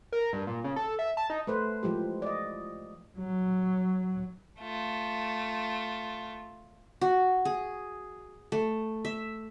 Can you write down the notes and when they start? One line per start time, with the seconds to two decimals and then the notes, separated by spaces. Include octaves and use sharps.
0.12 A#4
0.33 G2
0.47 A#2
0.64 C#3
0.76 A4
0.99 E5
1.17 A5
1.30 D#4
1.47 A3 B4 C5
1.83 E3 F3 G#3 G4
2.22 D5 D#5
3.19 F#3
4.60 A3 F4
7.01 F#4
7.45 G#4
8.52 A3
9.05 E5